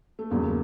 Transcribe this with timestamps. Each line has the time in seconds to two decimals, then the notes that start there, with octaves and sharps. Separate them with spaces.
0.19 A3
0.30 E2 C#3 F#3 A#3